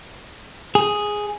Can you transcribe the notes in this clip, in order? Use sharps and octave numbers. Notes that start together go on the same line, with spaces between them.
G#4